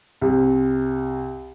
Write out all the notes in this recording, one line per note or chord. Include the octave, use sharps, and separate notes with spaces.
C2